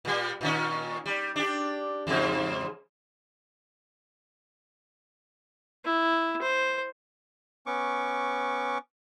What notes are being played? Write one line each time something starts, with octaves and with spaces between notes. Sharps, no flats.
A#2 G3
A#2 D#3 C#4
G3
D4 G4
E2 G#2 C#3
E4
C5
B3 C#4 C#6 D6